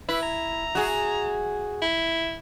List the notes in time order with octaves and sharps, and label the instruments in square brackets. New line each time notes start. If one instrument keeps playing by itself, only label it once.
[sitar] E4 [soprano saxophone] B4
[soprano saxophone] A#5
[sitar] F#4 G#4
[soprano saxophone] E4